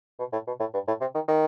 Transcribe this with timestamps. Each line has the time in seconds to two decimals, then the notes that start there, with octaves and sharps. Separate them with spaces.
0.19 B2
0.33 A2
0.47 B2
0.60 A2
0.74 G2
0.88 A2
1.01 C3
1.15 D#3
1.28 D#3